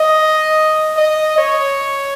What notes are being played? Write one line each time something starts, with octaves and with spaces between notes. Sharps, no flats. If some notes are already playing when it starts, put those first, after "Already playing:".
Already playing: D#5
D#5
C#5